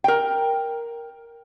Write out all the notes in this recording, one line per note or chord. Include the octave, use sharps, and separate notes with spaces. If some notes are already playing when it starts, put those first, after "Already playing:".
A#4 G5